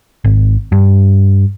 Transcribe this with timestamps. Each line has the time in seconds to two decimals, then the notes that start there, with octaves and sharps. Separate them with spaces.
0.24 G#1
0.72 G2